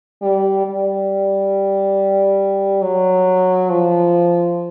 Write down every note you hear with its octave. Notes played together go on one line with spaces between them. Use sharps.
G3
G3
F#3
F3